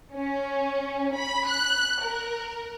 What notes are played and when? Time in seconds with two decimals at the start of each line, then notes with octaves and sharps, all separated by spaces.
0.14 C#4
1.16 B5
1.48 F#6
2.03 A#4